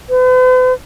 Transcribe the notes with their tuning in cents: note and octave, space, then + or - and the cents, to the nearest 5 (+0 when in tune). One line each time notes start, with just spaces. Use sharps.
B4 +45